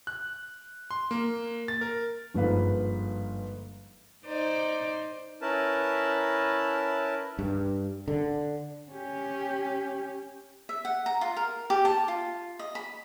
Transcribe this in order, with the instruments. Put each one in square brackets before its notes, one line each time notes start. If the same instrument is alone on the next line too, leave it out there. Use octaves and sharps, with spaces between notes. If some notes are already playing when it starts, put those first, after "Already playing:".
[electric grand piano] F#6
C6
A#3
A6
A#4
[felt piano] G1 G#2 F3 A#3 B4 F5
[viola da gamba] D#4 C5 D5
[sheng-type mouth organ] C#4 E4 A#4 B4 A5
[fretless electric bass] G2
D3
[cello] C#4 G4
[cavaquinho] E5
F#5
A#5
F4
A#4
G4
A5
F4
D#5
B5